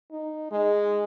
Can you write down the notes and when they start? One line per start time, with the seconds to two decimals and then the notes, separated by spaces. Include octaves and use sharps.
0.12 D#4
0.52 G#3